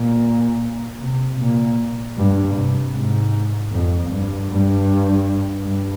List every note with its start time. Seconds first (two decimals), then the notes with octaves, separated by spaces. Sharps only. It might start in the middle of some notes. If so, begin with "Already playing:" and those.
Already playing: A#2
1.00 C3
1.39 A#2
2.17 G2
2.55 C3
2.94 G#2
3.71 F2
4.10 G2
4.49 G2
5.65 G2